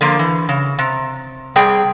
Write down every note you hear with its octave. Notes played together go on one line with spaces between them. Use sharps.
D3 F3 A#3
E3
C#3
C3
C3 G3 G#4 G5